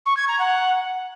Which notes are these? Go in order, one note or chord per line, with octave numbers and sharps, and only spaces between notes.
C#6
G#6
A#5
F#5